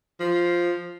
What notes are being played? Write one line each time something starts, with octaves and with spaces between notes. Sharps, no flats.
F3